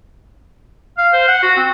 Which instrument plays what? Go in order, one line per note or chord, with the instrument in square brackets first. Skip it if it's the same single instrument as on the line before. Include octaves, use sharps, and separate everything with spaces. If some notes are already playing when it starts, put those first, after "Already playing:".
[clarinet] F5
C5
F#5
F#4
C4